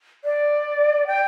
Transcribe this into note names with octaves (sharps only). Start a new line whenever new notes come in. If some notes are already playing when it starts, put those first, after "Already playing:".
D5
G5